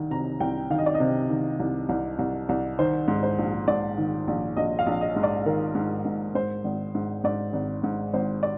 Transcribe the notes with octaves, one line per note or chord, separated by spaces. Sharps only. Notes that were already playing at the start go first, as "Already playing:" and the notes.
Already playing: C2 D#3
C3 A#5
C2 G5
D#3 F5
D#5
D5
D#5
C3
D#3
C2
C2
C2
C2
D#3 C5
G#2
C5
A#1
G#2 D5
D#3
A#1
A#1 D#5
F5
A#1
D#5
G#2
D5
D#3 A#4
G#2
G#2
G#2 C5
G#1
G#2
G#2 D5
G#1
G#2
G#1 C5
D5